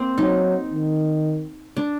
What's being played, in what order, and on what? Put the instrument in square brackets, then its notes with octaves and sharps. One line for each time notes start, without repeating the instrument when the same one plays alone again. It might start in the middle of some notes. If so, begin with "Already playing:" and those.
Already playing: [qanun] A#3 C4
[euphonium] F#3 [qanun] D#4
[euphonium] D#3
[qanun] D4